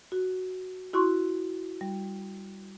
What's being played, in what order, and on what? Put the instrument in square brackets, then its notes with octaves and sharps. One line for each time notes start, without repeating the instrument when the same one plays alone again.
[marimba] F#4
E4 F#4 C6 C#6
G3